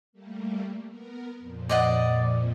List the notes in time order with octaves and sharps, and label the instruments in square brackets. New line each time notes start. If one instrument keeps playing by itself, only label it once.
[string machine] G3 A3 A#3
B3 A#4
F2 A#2 F3
[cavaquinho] D5 D#5 F#5